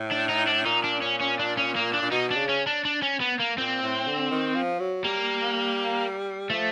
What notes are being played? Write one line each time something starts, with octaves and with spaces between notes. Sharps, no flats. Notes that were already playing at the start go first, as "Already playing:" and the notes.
Already playing: A2
D4
D#4
D4
A#2 D#4
D4
C#4
C#4
D4
C#4
A#3
D4
A#2
B2 D#4
D4
C#3
C#4
D4
D4
C#4
B3
A#3
A#2 C4
A2
D3
D#3
F3
F#3
G3 A#3
F3 A3